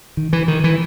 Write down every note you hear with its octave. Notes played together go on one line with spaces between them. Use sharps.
D#3
E3
D#3
E3